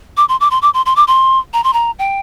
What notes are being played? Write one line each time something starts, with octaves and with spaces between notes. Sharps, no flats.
D6
C6
D6
C6
D6
C6
C6
D6
C6
A#5
C6
A#5
G5